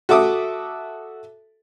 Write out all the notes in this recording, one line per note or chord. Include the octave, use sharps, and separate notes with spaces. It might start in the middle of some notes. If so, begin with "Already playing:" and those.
F#4 A4 E5 D6 D#6